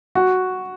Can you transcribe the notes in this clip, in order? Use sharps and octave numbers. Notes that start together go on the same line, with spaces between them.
F#4